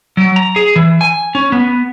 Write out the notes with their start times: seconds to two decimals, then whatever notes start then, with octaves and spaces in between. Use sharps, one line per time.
0.17 F#3
0.36 A#5
0.56 G#4
0.76 E3
1.01 G#5
1.35 C#4
1.52 B3